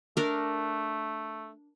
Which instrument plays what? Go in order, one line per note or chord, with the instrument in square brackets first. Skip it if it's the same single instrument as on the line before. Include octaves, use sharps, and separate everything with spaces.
[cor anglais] A3 [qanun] D4 A#4